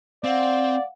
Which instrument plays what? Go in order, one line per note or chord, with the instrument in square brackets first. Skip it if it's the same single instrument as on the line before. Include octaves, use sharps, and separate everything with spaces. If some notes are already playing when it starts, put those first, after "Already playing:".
[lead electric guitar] C4 [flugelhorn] D5 [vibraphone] F5 F#5